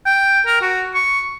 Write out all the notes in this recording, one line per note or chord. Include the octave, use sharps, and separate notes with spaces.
G5
A#4
F#4
C#6